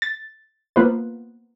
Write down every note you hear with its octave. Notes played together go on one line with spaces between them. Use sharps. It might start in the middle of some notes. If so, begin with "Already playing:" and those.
A6
A#3 B3 F4 B4 C5